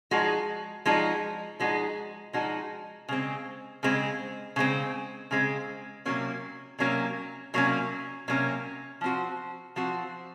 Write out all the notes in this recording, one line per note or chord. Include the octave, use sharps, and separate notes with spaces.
F3 G#3 D#4 F#4
F3 G#3 D#4 F#4
F3 G#3 D#4 F#4
F3 G#3 D#4 F#4
C#3 G#3 C4
C#3 G#3 C4
C#3 G#3 C4
C#3 G#3 C4
C3 F#3 A#3 C#4
C3 F#3 A#3 C#4
C3 F#3 A#3 C#4
C3 F#3 A#3 C#4
F3 C4 F#4
F3 C4 F#4